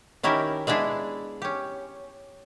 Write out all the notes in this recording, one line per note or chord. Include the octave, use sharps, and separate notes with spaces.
D#3 C#4 E4 G4 A#4
G#3 B3 D4 E4 G#4
C#4 G4